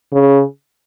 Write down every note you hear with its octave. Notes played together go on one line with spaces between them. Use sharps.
C#3